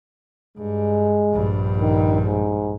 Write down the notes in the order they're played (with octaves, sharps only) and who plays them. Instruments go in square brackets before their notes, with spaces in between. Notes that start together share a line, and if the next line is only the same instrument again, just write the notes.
[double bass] G2 [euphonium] G#3
[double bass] A#1 G2
[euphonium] D#3
G#2